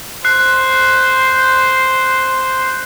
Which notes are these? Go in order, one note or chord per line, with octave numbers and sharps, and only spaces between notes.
C5 F#6 C7